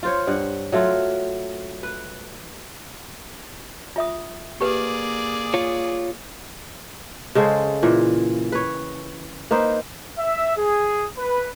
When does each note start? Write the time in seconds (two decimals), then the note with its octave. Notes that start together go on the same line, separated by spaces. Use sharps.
0.03 F4 C5 C#5
0.27 G2 F#5
0.72 F#3 A3 F4
1.83 B4
3.96 F4 E5 D#6
4.61 A#3 G4 G#4 B4 D5
5.54 F4 C#5
7.35 C#3 G#3 A4 C5
7.83 A#2 E3
8.52 B4 C#5
9.51 A#3 D#4 B4 C5
10.18 E5
10.57 G#4
11.18 B4